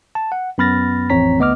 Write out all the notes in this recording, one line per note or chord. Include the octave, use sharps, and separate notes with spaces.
A5
F#5
F#2 B3 B5 F6 A6 A#6
A1 F2 C4 C#5 A#5 B6
D2 B3 D#5 D6 F6